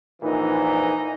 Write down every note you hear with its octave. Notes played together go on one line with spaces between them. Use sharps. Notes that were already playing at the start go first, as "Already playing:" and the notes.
A#1 A#2 E3 D#4